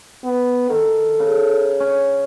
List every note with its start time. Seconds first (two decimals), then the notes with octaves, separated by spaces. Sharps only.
0.25 B3
0.70 D#3 A4
1.20 C#3
1.80 C#4